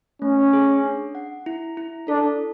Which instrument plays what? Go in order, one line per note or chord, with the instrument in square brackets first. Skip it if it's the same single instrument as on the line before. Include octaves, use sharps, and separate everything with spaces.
[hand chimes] A3 [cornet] C#4
[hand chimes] G#4
D4
F#5
E4
E4
[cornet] D4 [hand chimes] A4